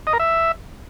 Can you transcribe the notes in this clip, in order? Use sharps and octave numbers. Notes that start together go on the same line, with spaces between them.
D#5
A#4
E5